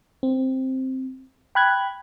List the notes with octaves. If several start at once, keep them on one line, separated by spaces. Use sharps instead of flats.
C4
G5 B5 F#6 G#6